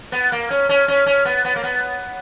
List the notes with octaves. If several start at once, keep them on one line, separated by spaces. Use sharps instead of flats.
B3
A#3
C#4
C#4
C#4
C#4
B3
B3
A#3
B3